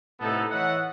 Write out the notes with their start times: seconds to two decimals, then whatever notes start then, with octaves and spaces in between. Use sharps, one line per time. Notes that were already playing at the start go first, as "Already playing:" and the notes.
0.20 A2 C3 B3 D#4 A4
0.51 E3 C#5 D#5 E5 F#5